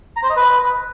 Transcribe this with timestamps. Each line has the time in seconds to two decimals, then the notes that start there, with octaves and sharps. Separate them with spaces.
0.16 A#5
0.23 C5
0.30 D#5
0.36 B4